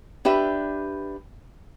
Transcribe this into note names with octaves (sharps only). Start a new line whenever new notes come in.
D4 G4 B4 E5